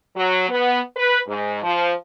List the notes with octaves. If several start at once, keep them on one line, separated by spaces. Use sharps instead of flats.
F#3
B3
B4
G#2
F3